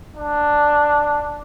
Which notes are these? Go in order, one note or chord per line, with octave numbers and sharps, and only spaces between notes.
D4